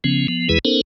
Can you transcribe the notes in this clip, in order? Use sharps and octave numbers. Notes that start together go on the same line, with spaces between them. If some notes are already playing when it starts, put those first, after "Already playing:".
C#3 F3 B3 C#4
F3 B3
E2 E3 G#3 E4 G#4 B4
B3 C#4 D#4 A4 A#4 C5